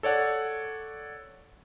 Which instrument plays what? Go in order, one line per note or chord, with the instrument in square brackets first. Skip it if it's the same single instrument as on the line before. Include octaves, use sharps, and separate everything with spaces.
[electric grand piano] A4 C#5 D5 F#5